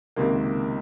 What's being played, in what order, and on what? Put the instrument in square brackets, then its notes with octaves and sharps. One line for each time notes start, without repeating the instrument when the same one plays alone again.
[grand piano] C#2 C3 D#3 A#3